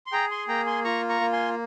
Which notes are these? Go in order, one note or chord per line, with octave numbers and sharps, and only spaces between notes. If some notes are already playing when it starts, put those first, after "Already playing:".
C6
G#4 G5 A#5
G#5 C6
A#3 G5 A#5
G#5 C6
F4 A#5 C#6
A#5 C#6
A#3
G#5 C6